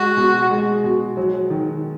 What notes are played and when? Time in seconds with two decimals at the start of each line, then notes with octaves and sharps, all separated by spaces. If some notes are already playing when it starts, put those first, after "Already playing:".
Already playing: G#3 F#4
0.17 B2
0.50 G#3
0.84 B2
1.17 F#3
1.50 D#3